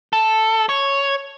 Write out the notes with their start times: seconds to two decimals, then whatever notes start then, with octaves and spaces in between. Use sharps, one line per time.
0.13 A4
0.69 C#5